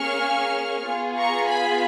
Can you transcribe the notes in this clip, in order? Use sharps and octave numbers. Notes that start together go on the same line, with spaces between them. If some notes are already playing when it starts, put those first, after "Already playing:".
Already playing: A#3 C#4 G#4 C#6 F6
B3 F4 G#4
A#5 C#6
G#5 B5